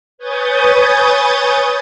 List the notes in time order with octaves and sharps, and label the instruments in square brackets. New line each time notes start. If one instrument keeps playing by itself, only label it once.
[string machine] B4 C#5 G#5 D#6 G6 A6